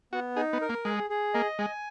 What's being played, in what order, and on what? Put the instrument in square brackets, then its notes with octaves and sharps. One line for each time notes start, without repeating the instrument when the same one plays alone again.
[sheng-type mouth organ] B3 [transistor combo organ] F#4
[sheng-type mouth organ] D#4 [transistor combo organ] G#4
[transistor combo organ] B3
[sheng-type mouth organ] A#4
[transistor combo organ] A#3
[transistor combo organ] G#3 [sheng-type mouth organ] G#4
[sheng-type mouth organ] G#4
[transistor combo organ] A#3 [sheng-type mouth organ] D#5
[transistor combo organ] G#3 [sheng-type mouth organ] G#5